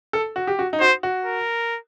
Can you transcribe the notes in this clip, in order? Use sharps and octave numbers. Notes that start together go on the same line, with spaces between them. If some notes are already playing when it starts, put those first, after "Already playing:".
A4
F#4
G4
F#4
D#4
F#4 C5
F#4
A#4